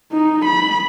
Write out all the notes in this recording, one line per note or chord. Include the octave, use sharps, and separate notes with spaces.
D#4
B5